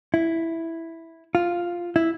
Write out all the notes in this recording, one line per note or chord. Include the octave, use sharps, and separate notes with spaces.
E4
F4
E4